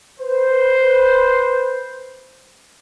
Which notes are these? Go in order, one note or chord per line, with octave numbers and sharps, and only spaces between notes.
B4 C5